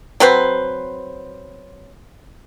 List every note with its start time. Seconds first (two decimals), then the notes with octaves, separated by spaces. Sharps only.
0.20 F#3 C4 B4 C5